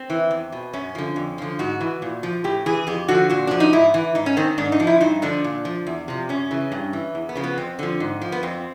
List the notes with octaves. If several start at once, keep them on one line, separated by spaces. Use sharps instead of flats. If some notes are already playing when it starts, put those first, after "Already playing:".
Already playing: C4
E3
E2
B2
F#2 C#4
D3 F3
F2
D3 F3
G#2 F#4
E3
A#2
F3
A2 G4
E3 G#4
F2 G4
D3 F3 F#4
A#2 F#4
F3 D4
D#4
G#2 E4
E3
G#2 D#4
C#4
D#3 C4
G#2 D4
D#4
F3
E4
G2 D#4
D3 F3 D4
A#2
F3
E2
C3 F3
F#2 C#4
C#3 E3
G2
E3
E2
B3
C#3 F3
B3
F2 C4
D3 F3
G#2
F3
B3
F2 C4